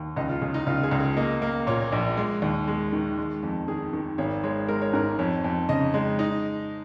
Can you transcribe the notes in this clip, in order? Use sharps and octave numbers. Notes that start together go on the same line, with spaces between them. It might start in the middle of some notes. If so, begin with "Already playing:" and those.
Already playing: D#2
C#2 D#5
F4
C#3 G#4
D#4
C#2 F4
G#4
C#2
G#4
A#3 D#5
A#3
A#2 C#5
A#1
G#3
D#2
G#3
D#3
G#3
F2
D#3 G#4
D#3
G#1 C#5
G#3 C#5
G#3 A#4
C#5
G#2 A#4
F2 C#5
F2
C#3 D#5
G#3
D#4